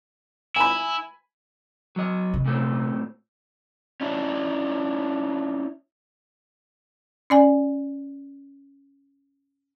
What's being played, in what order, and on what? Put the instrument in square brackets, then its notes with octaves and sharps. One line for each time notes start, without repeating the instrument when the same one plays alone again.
[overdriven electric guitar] E4 [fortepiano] G#5 B5
[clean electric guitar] F#3 D#5
[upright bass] C3
[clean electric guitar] A#2 A3 C4
[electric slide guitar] C#4 D4 E4
[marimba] C#4 D5 G#5